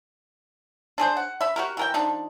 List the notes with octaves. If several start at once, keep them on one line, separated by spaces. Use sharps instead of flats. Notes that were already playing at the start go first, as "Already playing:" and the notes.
D4 G#4 C5
F#5
E5 B5
F#4 G4 A#4
E3 A#4 G5
F3 D4 D#4